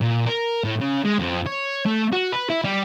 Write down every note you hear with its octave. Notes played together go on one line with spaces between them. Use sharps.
A#2
A#4
A2
C#3
G#3
F2
C#5
A3
F#4
B4
E4
G3